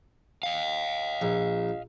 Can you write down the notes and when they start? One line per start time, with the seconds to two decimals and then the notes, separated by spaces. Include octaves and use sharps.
0.43 D#5 F5
1.22 A#1